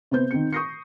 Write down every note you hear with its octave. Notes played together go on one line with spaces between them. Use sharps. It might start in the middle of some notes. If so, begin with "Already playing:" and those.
C3 B3 C5 G6
D#3 C4 C#7
C#6 D#6 G6 A#6 C7 C#7